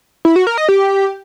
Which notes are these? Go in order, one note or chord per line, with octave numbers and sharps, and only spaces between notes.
E4
F#4
A#4
D#5
G4